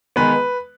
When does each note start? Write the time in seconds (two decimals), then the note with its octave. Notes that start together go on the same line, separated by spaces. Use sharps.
0.16 D#3 G#3 B3 B4